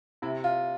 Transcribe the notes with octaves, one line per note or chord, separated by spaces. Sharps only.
C3 E4
F4